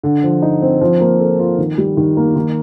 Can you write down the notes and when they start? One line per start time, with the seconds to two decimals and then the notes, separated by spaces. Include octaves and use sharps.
0.03 D3
0.23 F3
0.42 D#4
0.62 C4
0.81 F3
1.00 A#3
1.20 A4
1.39 F4
1.58 D#3
1.78 G3
1.97 D#3
2.17 A#3
2.36 D#3